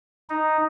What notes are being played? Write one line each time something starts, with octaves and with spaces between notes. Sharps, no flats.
D#4